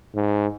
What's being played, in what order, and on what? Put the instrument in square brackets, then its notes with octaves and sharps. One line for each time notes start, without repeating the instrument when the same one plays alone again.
[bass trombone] G#2